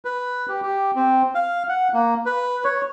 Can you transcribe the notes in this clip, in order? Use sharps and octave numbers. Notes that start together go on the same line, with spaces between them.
B4
G4
G4
C4
F5
F#5
A#3
B4
C#5